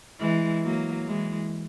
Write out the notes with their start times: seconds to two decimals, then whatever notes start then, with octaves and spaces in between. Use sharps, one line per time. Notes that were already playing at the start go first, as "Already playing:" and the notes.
0.20 E3 G#3
0.63 F#3 A#3
1.06 E3 G#3